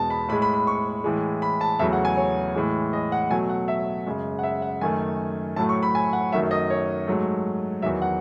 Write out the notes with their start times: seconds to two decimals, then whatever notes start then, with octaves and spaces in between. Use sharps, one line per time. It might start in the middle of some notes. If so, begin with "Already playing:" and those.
Already playing: E2 B2 G#3 A5
0.10 B5
0.29 A2 B5
0.32 G#3
0.42 B5
0.54 B5
0.67 C#6
1.04 A2 E3 G#3
1.42 B5
1.61 A5
1.79 E2 C#3 F#3 A3 E5
1.93 F#5
2.05 G#5
2.17 C#5
2.56 A2 E3 G#3
2.93 D#5
3.12 F#5
3.30 B2 F#3 A3 G#5
3.49 F#5
3.68 E5
4.07 F#2 C#3 G#3
4.39 F#5
4.43 E5
4.62 F#5
4.81 F#2 D#3 A3 G#5
5.56 A2 F#3 A3 A5
5.69 C#6
5.83 B5
5.95 G#5
6.13 F#5
6.32 F#2 D#3 F#3 A3 E5
6.51 D#5
6.70 C#5
7.07 G#2 F#3 A3
7.82 E2 D#3 F#3 E5
8.02 F#5